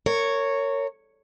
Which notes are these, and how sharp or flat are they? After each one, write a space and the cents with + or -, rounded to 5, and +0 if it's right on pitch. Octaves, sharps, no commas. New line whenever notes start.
A#4 -25 C#5 +0